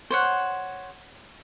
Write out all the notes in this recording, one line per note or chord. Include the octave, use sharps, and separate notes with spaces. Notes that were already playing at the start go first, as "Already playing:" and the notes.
C5 C#5 F#5